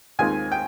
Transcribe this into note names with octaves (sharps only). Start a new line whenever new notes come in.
D#2 D#3 G#3 C4 F4 G#5
G5